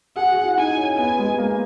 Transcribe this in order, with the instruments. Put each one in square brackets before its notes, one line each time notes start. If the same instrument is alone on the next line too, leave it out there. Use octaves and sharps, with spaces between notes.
[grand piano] G#4 [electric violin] F#5
[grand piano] F#4
E4
[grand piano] D#4 [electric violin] G#5
[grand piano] C#4
[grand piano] B3 [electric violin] G#5
[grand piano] G#3
A#3